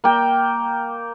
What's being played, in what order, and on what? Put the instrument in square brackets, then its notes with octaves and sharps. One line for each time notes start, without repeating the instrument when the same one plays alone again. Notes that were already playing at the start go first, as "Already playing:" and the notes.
[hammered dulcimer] A#3 G5